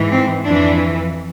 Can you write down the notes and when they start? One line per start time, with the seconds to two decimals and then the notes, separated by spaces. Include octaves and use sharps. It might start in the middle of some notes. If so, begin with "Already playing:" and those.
Already playing: G#2 E3
0.11 C4
0.44 F2 E3 D4